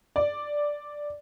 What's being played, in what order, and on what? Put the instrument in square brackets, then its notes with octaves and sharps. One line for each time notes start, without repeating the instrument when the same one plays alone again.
[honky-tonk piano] D5